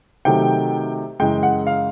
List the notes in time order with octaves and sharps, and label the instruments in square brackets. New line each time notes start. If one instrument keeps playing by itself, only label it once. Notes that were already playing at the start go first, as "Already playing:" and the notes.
[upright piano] C3 D#3 F#3 A3 G5
F#2 C#3 E3 G#3 G5
F#5
F5